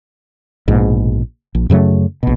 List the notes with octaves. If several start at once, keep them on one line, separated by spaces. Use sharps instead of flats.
A#1 G#2 B2
A#1
F#2 C#3 F#3 A3
A#1 B2